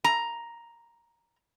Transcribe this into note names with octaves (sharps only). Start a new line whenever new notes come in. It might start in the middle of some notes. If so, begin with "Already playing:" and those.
A#5